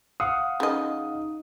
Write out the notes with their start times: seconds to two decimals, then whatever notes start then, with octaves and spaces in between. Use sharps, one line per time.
0.20 F5 F#5 D#6
0.60 C#3 D#4 D#5